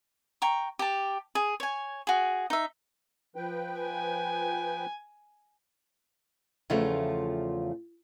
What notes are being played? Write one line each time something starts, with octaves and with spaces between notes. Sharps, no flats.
G5 A#5 C#6
G4 A5
G#4
C#5 G#5
F#4 G#4
D#4 E5
F3 B4 G5
G#5
E2 C#3 F3 A3 F4